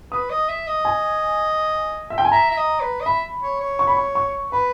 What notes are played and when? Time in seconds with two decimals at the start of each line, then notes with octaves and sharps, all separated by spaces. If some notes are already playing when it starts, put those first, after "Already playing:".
0.12 B4 D#6
0.30 D#5
0.49 E5
0.67 D#5
0.85 G#5
2.10 E5
2.18 G5
2.25 G#5
2.32 E5 A#5
2.51 E5
2.57 D#5
2.81 B4
3.01 D#5
3.06 E5 B5
3.42 C#5
3.61 C#5
3.79 C#6
3.87 B5
3.97 C#6
4.15 C#6
4.52 B4 B5